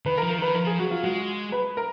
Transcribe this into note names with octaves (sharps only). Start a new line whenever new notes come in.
D#3 B4
A#4
F3
A#4
D#3 B4
F3 A#4
G#4
F#3 F#4
F4
G#3 F#4
B4
A#4